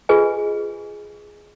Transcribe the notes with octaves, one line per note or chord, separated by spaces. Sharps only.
F4 G#4 B4 D#5 G#5